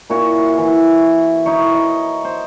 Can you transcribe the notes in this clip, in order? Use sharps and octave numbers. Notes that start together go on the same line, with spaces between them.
A#2 E4 F#4 C#5
E3
D#4 E4 C#5
D#5
C5